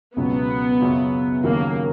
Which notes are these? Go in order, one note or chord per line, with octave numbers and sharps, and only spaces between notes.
C#2 B2 F#3 B3 C#4
F#2 C#3 F#3 C#4 F4
D#2 C#3 F#3 A#3